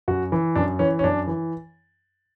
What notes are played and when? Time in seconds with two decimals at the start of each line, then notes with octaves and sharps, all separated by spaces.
0.08 F#2 F#4
0.32 E3
0.55 F#2 D4
0.79 E3 C#4
0.99 C#4
1.04 F#2 D4
1.27 E3